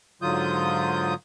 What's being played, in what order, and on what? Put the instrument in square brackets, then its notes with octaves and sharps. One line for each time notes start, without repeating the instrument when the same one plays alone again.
[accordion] G#2 D3 F#3 F4 D#6 G6